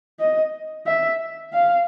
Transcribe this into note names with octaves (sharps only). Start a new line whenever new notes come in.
D#5
E5
F5